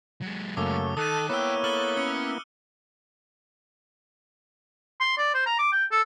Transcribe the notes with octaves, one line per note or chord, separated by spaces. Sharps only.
F#3 G#3
F#2 C#3 A3 A#3 D6 E6
D#3 A4 A5 D#6 F#6 D#7
A#3 B3 E4 A4 C#5 G5 E6 F#6
A4 F6 F#7 G7
C#4 C#7
C6
D5
C5
A#5
D6
G5
A4